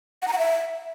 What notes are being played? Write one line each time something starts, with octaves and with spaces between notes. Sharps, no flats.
F#5
A#5
F#5
E5